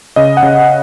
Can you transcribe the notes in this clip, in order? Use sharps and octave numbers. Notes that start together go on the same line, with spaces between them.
C#3 D#5
F#5
C#3